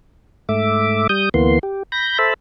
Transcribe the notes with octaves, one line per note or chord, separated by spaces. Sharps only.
G#2 A3 E5 D6
G3 D#6 G6
D2 E3 A#3 B3 C6
G4
B5 G6 A#6
A4 C5 E5 A5 B5